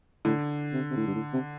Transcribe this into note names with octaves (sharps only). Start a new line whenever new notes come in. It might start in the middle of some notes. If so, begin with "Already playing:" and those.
A2 D3
C3
C3
A2
G2
A2
C3